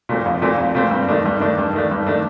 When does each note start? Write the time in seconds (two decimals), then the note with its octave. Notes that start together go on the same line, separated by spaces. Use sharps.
0.09 A#2 A3 C4
0.26 A#1
0.42 A#2 A3 C4
0.59 A#1
0.75 A#2 A3 C4
0.91 G2
1.09 D#3 A3 D4
1.25 G2
1.40 D#3 A3 D4
1.58 G2
1.73 D#3 A3 D4
1.91 G2
2.07 D#3 A3 D4